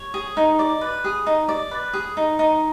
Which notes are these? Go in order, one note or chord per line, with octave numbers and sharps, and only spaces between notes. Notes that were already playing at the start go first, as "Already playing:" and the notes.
Already playing: C#5
G#4
D#4
D5
B4
G#4
D#4
D5
B4
G#4
D#4
D#4